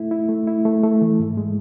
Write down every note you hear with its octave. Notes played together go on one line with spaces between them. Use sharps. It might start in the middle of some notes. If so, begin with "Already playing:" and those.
Already playing: A3 E4
E4
A3
E4
A3
A3
E3
G#2
G#3